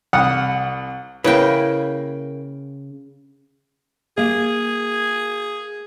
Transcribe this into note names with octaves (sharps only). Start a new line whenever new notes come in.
C2 F#5 D#6 F6
C#3 A#3 E4 B4 G5
A#3 G#4 F5